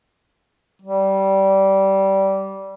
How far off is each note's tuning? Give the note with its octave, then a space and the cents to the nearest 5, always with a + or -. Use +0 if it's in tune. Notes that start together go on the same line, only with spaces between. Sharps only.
G3 -20